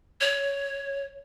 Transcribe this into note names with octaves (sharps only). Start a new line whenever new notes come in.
C#5